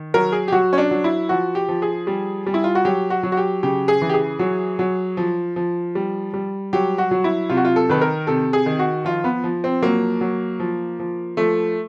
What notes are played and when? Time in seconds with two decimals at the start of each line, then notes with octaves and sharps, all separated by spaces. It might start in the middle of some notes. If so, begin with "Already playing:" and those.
Already playing: D#3
0.14 F#3 A#4
0.32 G#4
0.48 G4
0.52 F#3 F#4
0.73 C#4
0.78 D4
0.91 F#3
1.04 E4
1.29 F3 F#4
1.55 G4
1.69 F3
1.82 G#4
2.07 G3
2.46 G3
2.54 E4
2.64 F4
2.75 F#4
2.85 F#3 G4
3.10 F#4
3.23 F#3
3.32 F#4
3.37 G4
3.63 C#3 G4
3.88 G#4
4.01 E3
4.09 G4
4.14 G#4
4.39 F#3
4.79 F#3
5.17 F3
5.56 F3
5.95 G3
6.34 G3
6.73 F#3 G4
6.98 F#4
7.11 F#3
7.24 E4
7.49 C3 F4
7.57 F#4
7.65 F4
7.76 A4
7.89 D#3 B4
8.01 A#4
8.27 C3 A4
8.53 G#4
8.66 D#3
8.79 F#4
9.05 F3 F4
9.24 B3
9.44 F3
9.64 C4
9.82 F#3 A#3
10.21 F#3
10.60 F3
11.00 F3
11.37 F3 A3